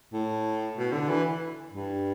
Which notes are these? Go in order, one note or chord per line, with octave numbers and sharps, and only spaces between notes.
A2
B2
D3
E3
G2